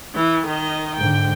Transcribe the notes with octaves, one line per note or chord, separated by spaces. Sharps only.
E3
D#3 D#5
G#2 D3 G5